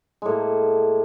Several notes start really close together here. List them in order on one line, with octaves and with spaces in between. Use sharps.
G#3 A2 A#3